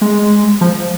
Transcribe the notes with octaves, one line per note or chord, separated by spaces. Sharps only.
G#3
F3